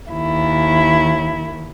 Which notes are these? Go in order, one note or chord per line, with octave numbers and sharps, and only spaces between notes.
D#2 E4